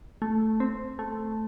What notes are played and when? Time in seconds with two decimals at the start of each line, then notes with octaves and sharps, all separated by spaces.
0.22 A3
0.60 C4
0.99 A3